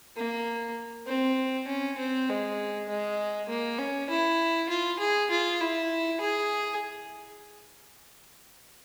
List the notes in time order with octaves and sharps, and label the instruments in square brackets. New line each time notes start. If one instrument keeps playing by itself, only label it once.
[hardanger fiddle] A#3
C4
C#4
C4
G#3
G#3
A#3
C#4
E4
F4
G#4
F4
E4
G#4